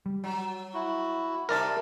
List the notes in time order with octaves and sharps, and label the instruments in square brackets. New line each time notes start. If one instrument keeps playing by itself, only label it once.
[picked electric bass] G3
[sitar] F#3
[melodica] E4 F#4
[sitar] C3 D#4 E5 [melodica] G3 [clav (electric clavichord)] A#4 D5 A5